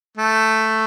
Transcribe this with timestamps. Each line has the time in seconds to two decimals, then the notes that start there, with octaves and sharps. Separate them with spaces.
0.17 A3